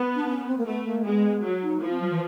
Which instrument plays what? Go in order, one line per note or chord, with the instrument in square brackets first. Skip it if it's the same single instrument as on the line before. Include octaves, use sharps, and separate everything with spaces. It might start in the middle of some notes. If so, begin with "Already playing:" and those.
Already playing: [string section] B3
[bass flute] D4
C#4
C4
A#3
[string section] A3 [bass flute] B3
[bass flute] A#3
[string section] G#3 [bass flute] B3
[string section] F#3
[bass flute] D#4
[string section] F3 [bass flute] E4
[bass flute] C4
F#3
E3